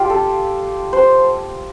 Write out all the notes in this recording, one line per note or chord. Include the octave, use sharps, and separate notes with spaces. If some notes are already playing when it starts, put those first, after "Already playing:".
Already playing: F4 G4
A4
C5